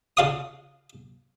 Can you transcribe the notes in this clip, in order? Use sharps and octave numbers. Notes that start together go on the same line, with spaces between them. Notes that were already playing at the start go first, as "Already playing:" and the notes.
C#3 F4 F5 C#6 D#6